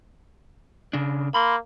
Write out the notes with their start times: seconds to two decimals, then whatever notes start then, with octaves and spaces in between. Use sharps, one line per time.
0.93 C#3 D4
1.34 A#3 B5 C6